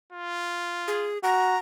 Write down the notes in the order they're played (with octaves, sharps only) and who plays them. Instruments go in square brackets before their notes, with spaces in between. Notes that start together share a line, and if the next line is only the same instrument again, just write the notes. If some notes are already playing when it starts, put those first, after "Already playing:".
[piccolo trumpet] F4
[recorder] G#4
[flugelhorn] F#4 [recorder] A#5